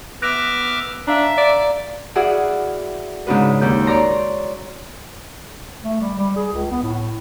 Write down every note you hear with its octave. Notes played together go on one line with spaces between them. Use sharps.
B3 E5 D6 F6 F#6 A#6 D7
D4 E5 F5 A#5
D5
E4 F#4 G#4 D5 F5 F#5
G#2 C#3 D4 F#4 B4
D#2 G6
C#5 D5 A#5 C6
A3
G3
G3
G#4
C#2
B3
A2